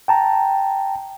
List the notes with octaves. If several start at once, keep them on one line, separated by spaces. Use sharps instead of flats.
G5 A5 A#5